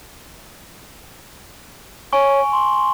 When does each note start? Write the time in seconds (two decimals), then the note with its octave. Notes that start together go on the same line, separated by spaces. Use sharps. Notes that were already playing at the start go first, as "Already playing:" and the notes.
2.13 C#5 G#5 C#6
2.52 C6